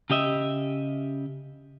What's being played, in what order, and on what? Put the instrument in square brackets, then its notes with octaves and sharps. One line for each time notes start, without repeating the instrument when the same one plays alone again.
[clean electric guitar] C#3 G4 D#5 E5